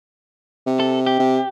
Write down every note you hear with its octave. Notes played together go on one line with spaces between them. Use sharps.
C3
A4
G4
C3